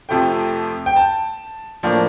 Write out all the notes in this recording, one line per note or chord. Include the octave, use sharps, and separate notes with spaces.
F2 C3 F3 A3 G5
G5
A5
A2 F3 A#3 D4